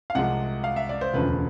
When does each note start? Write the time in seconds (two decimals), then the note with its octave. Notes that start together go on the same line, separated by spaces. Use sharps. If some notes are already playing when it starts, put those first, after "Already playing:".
0.10 F5
0.15 C2 C3 F3 G#3 F#5
0.64 F5
0.76 E5
0.89 D5
1.01 C5
1.13 E1 D2 C#3 F3 B4